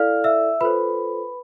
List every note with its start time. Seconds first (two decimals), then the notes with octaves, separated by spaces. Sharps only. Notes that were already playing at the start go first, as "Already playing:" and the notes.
Already playing: E4 A4 D5 F5 F6
0.24 E5 E6
0.61 F4 A4 B4 C5 B5